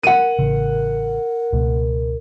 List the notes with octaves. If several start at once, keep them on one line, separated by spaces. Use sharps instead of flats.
A#4 F#5 D#7
A1 C#3
C#2 B2 A3